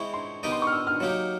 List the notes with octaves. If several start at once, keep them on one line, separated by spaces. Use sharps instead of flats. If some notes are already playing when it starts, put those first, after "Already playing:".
Already playing: G#3 C4 E4 C#6
C6
B3 D#4 G4 A#4 D#5
C6
C#6 F6
E6
F6
F#3 A#3 D#4 G4